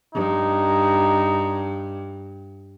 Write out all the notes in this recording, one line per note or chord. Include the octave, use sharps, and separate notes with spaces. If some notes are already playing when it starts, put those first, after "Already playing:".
G2 D#4